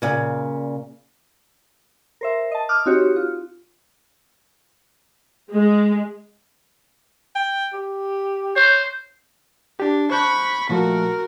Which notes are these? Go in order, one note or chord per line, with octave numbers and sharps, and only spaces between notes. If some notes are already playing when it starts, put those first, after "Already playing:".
A#2 C#3
A#4 C5 E5
D#5 A5
D6 D#6 F6 F#6
C4 D#4 F#4 G4 C#5
F4
G#3
G5
G4
C5 C#5
D4 G4
C5 B5 C#6 F#6 G6
A#2 F3 A3 F#4 A#4